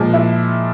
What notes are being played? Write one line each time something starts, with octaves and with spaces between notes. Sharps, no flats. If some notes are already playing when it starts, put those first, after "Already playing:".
Already playing: A#2 F3 G#3
E4